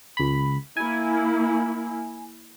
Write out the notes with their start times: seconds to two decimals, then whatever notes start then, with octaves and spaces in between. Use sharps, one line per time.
0.17 C#2 B5
0.77 A#3 E4 G#5